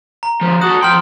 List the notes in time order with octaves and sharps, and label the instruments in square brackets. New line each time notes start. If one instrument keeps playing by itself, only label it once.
[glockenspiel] A#5
[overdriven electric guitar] D3 F3
[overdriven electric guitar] F#4 A4 [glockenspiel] D#6
[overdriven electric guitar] F3 G5 [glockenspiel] C6 F6